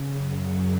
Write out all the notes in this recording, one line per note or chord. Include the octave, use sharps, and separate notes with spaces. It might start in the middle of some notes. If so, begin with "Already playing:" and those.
Already playing: C#3
F#2 F#3